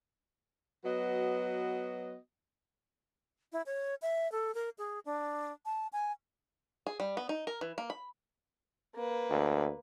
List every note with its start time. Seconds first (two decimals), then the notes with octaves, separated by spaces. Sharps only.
0.85 F#3 B3 F#4 B4 D#5
3.52 E4
3.66 C#5
4.02 E5
4.32 A4
4.55 A#4
4.78 G#4
5.05 D4
5.66 A5
5.93 G#5
6.87 G#4
7.00 G3
7.17 B3
7.29 D#4
7.47 A#4
7.61 E3
7.78 A#3
7.90 B5
8.95 A#3 B4
9.30 D2